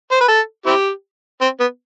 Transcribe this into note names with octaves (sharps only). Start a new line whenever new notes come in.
C5
B4
A4
C4 E4 G4
C4
B3